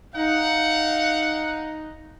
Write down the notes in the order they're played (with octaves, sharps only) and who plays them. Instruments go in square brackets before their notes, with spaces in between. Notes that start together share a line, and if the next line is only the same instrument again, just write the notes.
[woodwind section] D#4 [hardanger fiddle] F5 [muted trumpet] F#5